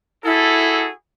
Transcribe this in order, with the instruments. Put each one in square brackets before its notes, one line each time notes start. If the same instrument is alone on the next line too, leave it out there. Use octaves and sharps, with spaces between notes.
[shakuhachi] E4 [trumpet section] F#4 G#4 A4